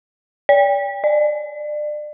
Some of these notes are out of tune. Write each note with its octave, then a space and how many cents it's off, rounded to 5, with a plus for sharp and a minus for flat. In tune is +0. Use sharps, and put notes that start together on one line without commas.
D5 -45
D5 +30